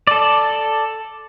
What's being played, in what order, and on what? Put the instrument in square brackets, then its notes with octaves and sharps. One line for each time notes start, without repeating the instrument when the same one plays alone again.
[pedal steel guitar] A4 D5